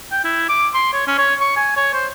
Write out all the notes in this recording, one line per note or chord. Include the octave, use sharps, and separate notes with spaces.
G5
E4
D6
C6
C#5
C#4
C#5
C#6
G#5
C#5
C5